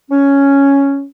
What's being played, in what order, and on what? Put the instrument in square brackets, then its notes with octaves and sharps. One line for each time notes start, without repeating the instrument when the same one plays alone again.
[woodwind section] C#4